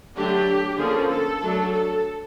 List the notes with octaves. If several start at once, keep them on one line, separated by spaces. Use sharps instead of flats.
D3 F#3 A3 D4 G4
D3 F3 A#3 C#4 G#4
A4
F#3 A3 D4
A4